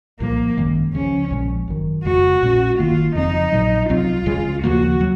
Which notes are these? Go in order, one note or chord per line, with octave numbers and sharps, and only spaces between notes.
C2 A#2 F3 A#3
G#1 F#2 D#3 G#3
C#2 C#3 F3 C#4
A#1 A#2 F3 G#3
G#1 F#2 D#3
F1 F2 C#3 G#3 F#4
A#1 A#2 G#3 C#4
F#1 F#2 D#3 A#3 F4
F2 C#3 F3 C4 D#4
A#1 A#2 F#3
C#2 C3 F#3 C4 F4
C#2 C#3 G#3
D#2 C#3 F3 A#3 F#4
F#3